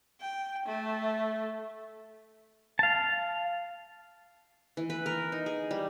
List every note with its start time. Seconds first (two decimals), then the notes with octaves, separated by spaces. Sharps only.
0.21 G5
0.66 A3
2.79 F5 A5
4.77 E3
4.90 B4
5.06 A#4
5.32 D#4
5.46 G#4
5.71 G3